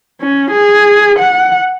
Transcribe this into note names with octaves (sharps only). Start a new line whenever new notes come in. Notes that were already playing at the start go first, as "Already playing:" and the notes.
C#4
G#4
F#5